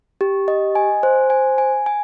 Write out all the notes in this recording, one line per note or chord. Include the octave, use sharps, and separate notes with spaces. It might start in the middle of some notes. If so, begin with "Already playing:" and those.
G4
D#5
G#5
C5
G#5
G#5
G#5